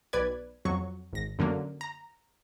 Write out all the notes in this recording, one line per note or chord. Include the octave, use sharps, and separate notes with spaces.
B1 B4 D5 G#6
F2 F#3 C#6
G#1 A#6
F#2 D3 F#3 A#3
A#5